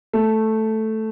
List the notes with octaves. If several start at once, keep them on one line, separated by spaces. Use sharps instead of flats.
A3